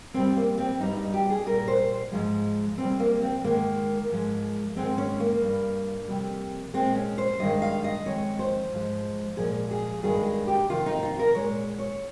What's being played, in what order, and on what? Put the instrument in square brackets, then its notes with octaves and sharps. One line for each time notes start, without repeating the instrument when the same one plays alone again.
[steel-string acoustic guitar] F2 C3 G3 C4
A#3
C4
G2 G3 D#4
D#4
G4
G#4
A#2 G3 A#4
C5
G#2 F3 G#3
F2 C3 G3 C4
A#3
C4
G#2 D#3 G#3 A#3
G#2 F3 G#3
G#2 D#3 G#3 C4
C#4
A#3
G2 G3
F2 C3 G3
A#2 G#3 C4
C#4
C5
G2 D#3 G#3 D#5
F5
D#5
F2 D#3 G#3 C#5
C5
G#2 F3 G#3
A#2 F3 G#3 G#4
G#4
G2 D#3 G#3 G#4
G#4
G4
F2 C3 D#3 F4
D#4
F4
A#4
A#2 G#3 C#5
C#5